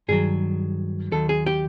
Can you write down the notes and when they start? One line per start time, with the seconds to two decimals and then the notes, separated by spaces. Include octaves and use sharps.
0.08 G2 D#3 F#3 G#4
1.12 D#2 D#3 F#3 A4
1.29 G#4
1.46 G4